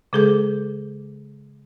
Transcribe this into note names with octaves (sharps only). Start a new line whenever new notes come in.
C#3 G#3 G#4 A4 G6